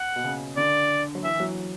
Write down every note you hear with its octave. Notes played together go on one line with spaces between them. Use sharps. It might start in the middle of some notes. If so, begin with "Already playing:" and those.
Already playing: F#5
B2
C#3
D3 D5
F#3
E3 E5
E3
F#3